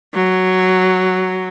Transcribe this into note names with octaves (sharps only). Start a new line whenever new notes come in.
F#3